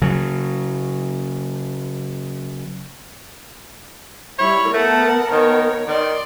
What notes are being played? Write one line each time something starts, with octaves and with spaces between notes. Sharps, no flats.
C#3 F#3
G3 E4 C#5 B5
A3 B3 A#4 F#5 A5
D#3 C#5
D#3 D5 C6